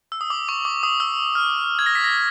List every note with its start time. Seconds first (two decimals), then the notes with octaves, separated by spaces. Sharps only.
0.12 E6
0.21 D#6
0.30 D6
0.49 C#6
0.65 D6
0.83 D#6
1.00 E6
1.35 F6
1.79 G#6
1.86 A#6
1.95 B6
2.04 A#6